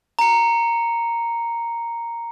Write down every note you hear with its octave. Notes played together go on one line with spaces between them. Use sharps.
A#5 C#7